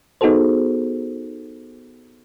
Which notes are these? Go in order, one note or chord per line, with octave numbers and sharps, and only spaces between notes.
B3 D#4 F#4 G#4 A4 C5